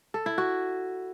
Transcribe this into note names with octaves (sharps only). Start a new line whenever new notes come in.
A4
E4
F#4